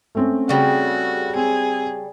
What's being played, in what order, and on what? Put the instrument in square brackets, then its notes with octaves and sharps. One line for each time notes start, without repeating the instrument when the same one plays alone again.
[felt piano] A3 C4 C#4
[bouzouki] C#3 G3 [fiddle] F#4
[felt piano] C4 [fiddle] G#4